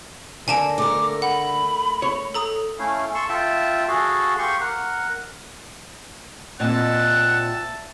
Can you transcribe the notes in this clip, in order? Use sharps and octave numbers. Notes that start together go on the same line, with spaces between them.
D3 A#3 G#5 A5 D7
A3 A#4 D6
F#5 B5
C#5
A4 A#5 D#6
A3 C#4 E4 F5
A4 C6 C#6 E6
F4 E5 G5 A5
F#4 G#4 A4 F5
G4 F5 C6 C#6
A#4 F#5
A#2 C4 D#5 E5 F#5 A5